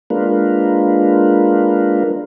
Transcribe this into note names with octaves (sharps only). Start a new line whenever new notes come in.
G#3 A#3 D4 F4 A#4 B4